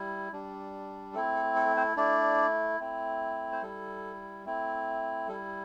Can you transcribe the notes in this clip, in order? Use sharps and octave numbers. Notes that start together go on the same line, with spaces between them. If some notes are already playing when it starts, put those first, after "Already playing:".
Already playing: G3 E4
G3 D4
A3 C4 E4 A4
A4
A4
C4 C5
A3 D4 E4 D5
A3 C4 E4
C5
G3 E4 A4
A3 C4 E4
G3 E4 A4